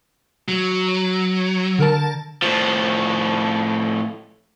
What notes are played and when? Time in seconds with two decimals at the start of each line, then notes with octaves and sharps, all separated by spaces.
0.48 F#3
1.79 D3 A#4 A5
2.42 A2 F3